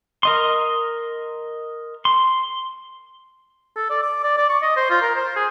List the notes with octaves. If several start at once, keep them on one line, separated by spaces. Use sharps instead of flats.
A#4 D#5 C6
C6
A4
D5
D6
D5
D5
C#6
D#5
C5
F4
A#4
C5
G#4